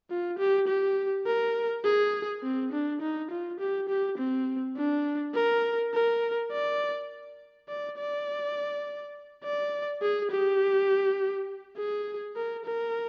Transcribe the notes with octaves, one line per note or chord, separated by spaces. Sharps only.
F4
G4
G4
A#4
G#4
C4
D4
D#4
F4
G4
G4
C4
D4
A#4
A#4
D5
D5
D5
D5
G#4
G4
G#4
A#4
A#4